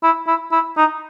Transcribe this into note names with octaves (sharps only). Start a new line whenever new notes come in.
E4
E4
E4
D#4